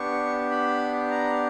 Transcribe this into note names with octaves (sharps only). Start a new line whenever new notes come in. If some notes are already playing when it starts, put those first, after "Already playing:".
Already playing: B3 D4 G4 C#6
B5
A#5